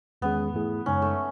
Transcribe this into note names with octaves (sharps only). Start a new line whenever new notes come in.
E2 D#3 G#3 B3 C#4 G#4
G#2 E3 A3 E4 G#4
F#2 C#3 G#3 C#4 D#4
A3